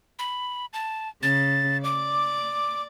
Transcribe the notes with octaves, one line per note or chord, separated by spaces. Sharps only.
B5
A5
C#3 A6
D5 D6